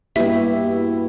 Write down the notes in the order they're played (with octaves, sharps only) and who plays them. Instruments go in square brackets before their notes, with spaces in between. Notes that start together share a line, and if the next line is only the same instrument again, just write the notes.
[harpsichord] G2 B2 [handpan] A#3 G4 [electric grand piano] E4 [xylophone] E5